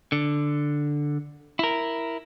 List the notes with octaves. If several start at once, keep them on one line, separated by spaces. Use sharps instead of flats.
D3
E4 A#4